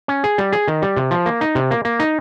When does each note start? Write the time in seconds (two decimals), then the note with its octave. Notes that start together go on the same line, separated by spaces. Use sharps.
0.08 C#4
0.24 G#4
0.38 G3
0.52 G#4
0.68 D#3
0.82 G3
0.97 C3
1.11 F3
1.26 A#3
1.41 D#4
1.55 C3
1.71 A#3
1.85 A#3
2.00 D#4